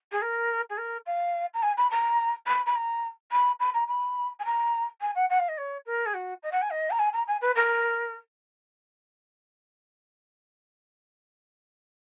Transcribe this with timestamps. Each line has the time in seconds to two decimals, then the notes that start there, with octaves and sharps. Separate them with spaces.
0.11 G#4
0.21 A#4
0.69 G#4
0.77 A#4
1.06 F5
1.54 A#5
1.62 G#5
1.77 B5
1.90 A#5
2.47 B5
2.66 B5
2.75 A#5
3.32 B5
3.59 B5
3.74 A#5
3.88 B5
4.39 G#5
4.45 A#5
5.01 G#5
5.15 F#5
5.29 F#5
5.39 F5
5.48 D#5
5.57 C#5
5.86 A#4
6.06 G#4
6.14 F#4
6.43 D#5
6.52 F#5
6.61 G#5
6.70 D#5
6.90 A#5
6.99 G#5
7.13 A#5
7.27 G#5
7.41 B4
7.55 A#4